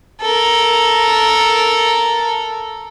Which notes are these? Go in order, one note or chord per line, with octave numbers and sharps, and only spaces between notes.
A4 A#4